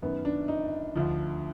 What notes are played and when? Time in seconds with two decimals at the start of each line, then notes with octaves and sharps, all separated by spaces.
0.02 F#2 D#3 B3
0.25 D4
0.48 D#4
0.96 D2 D3 F3